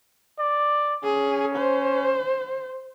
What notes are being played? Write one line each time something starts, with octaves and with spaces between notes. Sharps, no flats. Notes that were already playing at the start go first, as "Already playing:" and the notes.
D5
C#4 G#4
C5